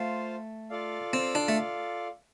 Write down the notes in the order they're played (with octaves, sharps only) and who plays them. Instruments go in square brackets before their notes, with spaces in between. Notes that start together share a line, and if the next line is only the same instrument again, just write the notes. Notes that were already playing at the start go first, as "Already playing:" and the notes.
Already playing: [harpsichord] A3 [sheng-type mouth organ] F4 C5 F5
[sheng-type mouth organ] F4 A4 D5 F5
[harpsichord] C4
D4
A3